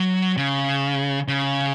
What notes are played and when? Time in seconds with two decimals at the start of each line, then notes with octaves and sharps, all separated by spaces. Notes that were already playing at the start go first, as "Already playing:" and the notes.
Already playing: F#3
0.37 C#3
1.28 C#3